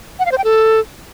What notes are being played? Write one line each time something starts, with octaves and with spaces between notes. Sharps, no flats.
F#5
F5
C5
G5
A4